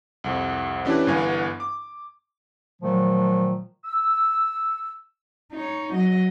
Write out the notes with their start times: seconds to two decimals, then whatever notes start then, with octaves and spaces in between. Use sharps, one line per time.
0.24 C2 F2
0.85 E3 C#4 D4 E4 G4 B4
1.07 G1 G2 E3 B3 G#5
1.60 D6
2.81 A#2 D#3 F3 F#3 A3
3.85 E6
5.53 D#4 C#5
5.93 F#3 D#5